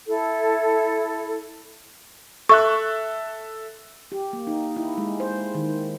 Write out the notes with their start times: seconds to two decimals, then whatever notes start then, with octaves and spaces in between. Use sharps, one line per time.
0.07 E4 A4
2.49 A4 E5 C#6 F#6
4.12 G4
4.33 A#3
4.47 D#4
4.76 E4
4.98 G#3
5.20 C5
5.55 D#3